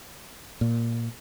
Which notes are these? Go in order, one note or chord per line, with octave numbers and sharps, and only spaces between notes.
A#2